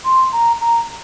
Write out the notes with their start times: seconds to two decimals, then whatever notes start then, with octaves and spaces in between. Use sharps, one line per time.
0.05 C6
0.33 A#5
0.61 A#5